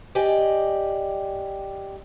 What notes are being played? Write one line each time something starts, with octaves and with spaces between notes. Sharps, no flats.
G4 D5 D#5 G5 G#5